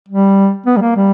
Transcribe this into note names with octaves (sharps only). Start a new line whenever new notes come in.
G3
B3
G3
A#3
G3